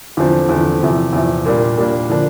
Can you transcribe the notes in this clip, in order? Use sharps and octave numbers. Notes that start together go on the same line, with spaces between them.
E2 D3 F3 C4
E2 D3 F3 C4
E2 C3 F3
E2 C3 F3
A#2 G3 A#3 D4
A#2 G3 A#3 D4
D3 F3 A#3 D4